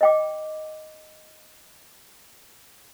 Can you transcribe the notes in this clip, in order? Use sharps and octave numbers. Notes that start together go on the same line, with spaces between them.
D#5 G5 D6